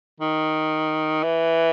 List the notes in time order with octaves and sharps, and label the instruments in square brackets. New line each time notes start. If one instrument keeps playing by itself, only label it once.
[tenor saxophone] D#3
E3